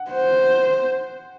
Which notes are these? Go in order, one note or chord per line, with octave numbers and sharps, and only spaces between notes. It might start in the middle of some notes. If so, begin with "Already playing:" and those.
Already playing: F#5
C5